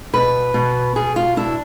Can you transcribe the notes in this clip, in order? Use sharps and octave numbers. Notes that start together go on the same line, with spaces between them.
B2 B4
B2
B2 G#4
F4
D4 E4